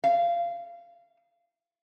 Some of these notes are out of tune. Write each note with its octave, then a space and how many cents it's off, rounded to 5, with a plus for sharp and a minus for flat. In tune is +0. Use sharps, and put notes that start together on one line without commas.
F5 -20